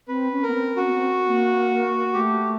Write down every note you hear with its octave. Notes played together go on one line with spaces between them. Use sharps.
C4 B4
C#4
B3 A#4
C4
C#4 F#4
B3
C4
A#3
A3 G4